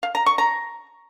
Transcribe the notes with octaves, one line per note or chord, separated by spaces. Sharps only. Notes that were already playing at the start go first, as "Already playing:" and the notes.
F5
A#5
C#6
A#5